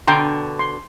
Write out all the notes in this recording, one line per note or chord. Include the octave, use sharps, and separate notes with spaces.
B2 D3 G5 A#5 C6
C6